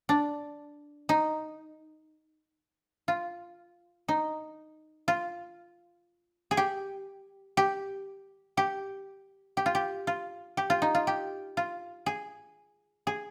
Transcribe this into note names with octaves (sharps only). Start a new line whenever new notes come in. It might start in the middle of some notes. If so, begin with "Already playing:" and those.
D4
D#4
F4
D#4
F4
G#4
G4
G4
G4
G4
F4
G4
F4
G4
F4
D#4
F4
G4
F4
G#4
G#4